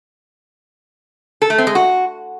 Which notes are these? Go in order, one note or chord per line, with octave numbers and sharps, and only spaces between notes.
A4
A3
C4
G#3
F#4